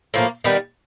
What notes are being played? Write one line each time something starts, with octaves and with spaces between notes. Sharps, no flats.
A2 F3 A#3
D#3 G3 B3